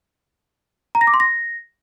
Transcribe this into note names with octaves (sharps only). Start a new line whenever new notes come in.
A#5
A#6
D6
C6
A#6